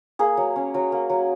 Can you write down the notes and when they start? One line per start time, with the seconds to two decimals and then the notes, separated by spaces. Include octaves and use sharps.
0.19 A#3 G#4
0.37 F#3
0.56 C#4
0.74 F#3
0.92 A#3
1.10 F#3